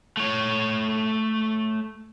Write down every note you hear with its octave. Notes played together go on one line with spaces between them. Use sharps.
A3 C#5